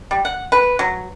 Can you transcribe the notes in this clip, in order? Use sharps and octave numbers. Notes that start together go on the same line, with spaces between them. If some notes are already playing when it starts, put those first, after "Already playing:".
G3
F#5
B4
F#3